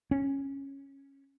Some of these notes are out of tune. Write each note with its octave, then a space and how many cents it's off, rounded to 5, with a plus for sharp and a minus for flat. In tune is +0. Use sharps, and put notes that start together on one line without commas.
C#4 -10